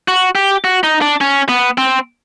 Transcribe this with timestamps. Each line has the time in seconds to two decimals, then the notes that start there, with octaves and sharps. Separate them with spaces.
0.08 F#4
0.35 G4
0.64 F#4
0.84 D#4
1.02 D4
1.21 C#4
1.49 B3
1.78 C4